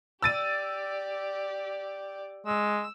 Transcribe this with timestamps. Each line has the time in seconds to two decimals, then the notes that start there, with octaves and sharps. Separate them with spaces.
0.22 G4 D5 E6 A6 D#7
2.47 G#3 E6